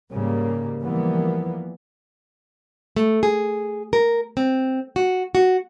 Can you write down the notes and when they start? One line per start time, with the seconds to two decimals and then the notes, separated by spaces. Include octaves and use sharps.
0.12 G#2 C#3 G3 A#3
0.81 E3 F3 G3 A#3 B3
2.96 A3
3.23 G#4
3.93 A#4
4.37 C4
4.96 F#4
5.35 F#4